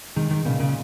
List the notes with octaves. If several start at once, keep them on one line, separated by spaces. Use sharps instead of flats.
D#3 G#3
D#3
A#2 C#3
C#3